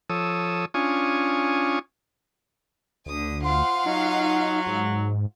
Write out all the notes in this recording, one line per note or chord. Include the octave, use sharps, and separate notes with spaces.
F3 A4 C#5 D#6 E6
C#4 D4 F4 G#5 C#6 D#6
D2 D3 D#6
F4 C5 F5 F#5
F#3 D#4
G#2